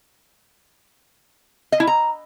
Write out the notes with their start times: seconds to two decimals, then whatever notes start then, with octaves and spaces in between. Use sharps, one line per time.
1.72 D#5
1.80 E4
1.87 A#5